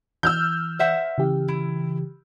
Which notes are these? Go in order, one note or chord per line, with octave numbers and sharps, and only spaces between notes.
E3 E6 F6 G6
C5 E5 F#5
C#3 E3 G4
E4